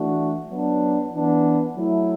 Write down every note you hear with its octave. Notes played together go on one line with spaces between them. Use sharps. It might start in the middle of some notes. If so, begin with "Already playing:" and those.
Already playing: E3 A3 D4 F#4
F#3 B3 D4
E3 B3 D4
F#3 A3 E4